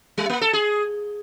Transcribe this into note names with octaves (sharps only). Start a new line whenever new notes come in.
G3
A#3
A4
G#4